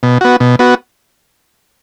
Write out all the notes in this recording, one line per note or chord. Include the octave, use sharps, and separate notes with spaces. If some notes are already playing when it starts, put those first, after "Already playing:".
B2
B3 F#4
B2
B3 F#4